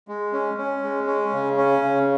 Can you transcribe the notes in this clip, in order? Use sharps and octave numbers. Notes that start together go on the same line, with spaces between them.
G#3
C#4
C#4
G#3
C#4
C#3
C#4
C#3